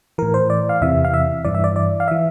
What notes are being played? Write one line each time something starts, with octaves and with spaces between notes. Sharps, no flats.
A2 E3 A#4
C5
D5
F5
E2 C3 E3 E5
F5
E5
G2 E3 D5
E5
D5
D5
F5
E3 E5